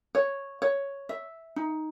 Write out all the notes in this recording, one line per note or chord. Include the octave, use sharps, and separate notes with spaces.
C#5
C#5
E5
D#4